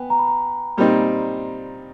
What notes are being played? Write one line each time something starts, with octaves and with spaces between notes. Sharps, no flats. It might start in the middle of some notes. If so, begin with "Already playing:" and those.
Already playing: B3 G5 G#5
A#5
B5
A#5
A#2 G3 C4 D#4